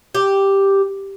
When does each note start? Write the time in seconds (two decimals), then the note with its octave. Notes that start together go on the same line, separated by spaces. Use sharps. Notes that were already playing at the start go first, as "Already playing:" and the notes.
0.15 G4